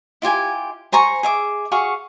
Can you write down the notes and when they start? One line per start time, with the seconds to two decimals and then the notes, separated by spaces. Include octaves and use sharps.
0.22 E4 F4 G4 G#5
0.92 C5 G#5 A#5 C#6
1.23 G#4 E5 D6
1.71 F#4 G#4 F5 C#6